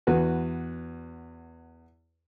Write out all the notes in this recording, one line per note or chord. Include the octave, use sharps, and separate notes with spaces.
E2 F#4 B4